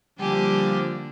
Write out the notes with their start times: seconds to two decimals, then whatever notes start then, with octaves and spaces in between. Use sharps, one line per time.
0.20 D3 F3 G3 A#3 D4 G4 G#5